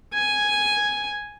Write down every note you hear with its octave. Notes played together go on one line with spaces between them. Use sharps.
G#5